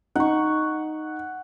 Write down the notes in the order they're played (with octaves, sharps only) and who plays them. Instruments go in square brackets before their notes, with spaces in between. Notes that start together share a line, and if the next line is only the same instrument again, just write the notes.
[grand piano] D#4 [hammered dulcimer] F#5 C#6